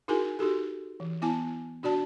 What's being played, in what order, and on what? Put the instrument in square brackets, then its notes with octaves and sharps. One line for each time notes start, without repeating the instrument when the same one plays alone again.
[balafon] D#4 E4 F#4 G#4 A#4 G#5
D#4 F#4 G4 A4
E3
B3 E4 G#5 A5
D4 F#4 D5 A5